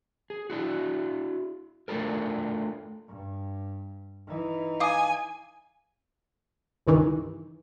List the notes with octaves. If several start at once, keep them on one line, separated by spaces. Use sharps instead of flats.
G#4
D4 E4 F#4
A3 D4 F4 A4 A#4
G2
E3 D#4
F5 G#5 D6 D#6
C#2 G2 D#3 E3